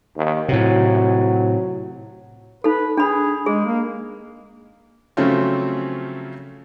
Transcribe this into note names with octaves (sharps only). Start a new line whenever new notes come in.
D#2
A2 C3 F#3
D#4 A4 B4
D4 G#4 B5
G#3 G#4
A#3
C#3 F3 F#3 A3 C4 C#4